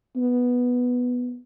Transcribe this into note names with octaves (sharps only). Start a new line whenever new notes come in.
B3